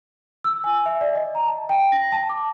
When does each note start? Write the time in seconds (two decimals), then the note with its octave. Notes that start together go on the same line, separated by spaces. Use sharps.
0.44 E6
0.64 G#5
0.86 E5
1.01 D5
1.15 D#5
1.35 A#5
1.47 A5
1.69 G5
1.92 A#6
2.12 A5
2.29 D6